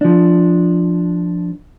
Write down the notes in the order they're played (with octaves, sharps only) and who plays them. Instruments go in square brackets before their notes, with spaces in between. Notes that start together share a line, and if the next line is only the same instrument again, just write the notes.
[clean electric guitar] F3 D4